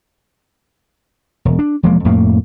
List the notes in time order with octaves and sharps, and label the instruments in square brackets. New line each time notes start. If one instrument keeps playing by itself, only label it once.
[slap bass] E1
D4
E1 F3 G#3 A#3
F2 A2 A3 A#3